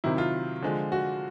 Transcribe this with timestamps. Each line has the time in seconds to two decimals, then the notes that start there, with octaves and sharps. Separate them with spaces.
0.04 C3 D#3 F#3 E4
0.18 F4
0.62 D3 F3 G#3
0.92 F#4